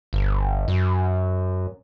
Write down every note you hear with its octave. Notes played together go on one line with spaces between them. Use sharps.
G1
F#2